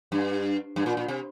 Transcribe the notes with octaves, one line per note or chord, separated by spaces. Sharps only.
G2
G2
A#2
A#2
C3